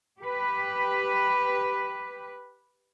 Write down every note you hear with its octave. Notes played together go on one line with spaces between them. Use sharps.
G4 B4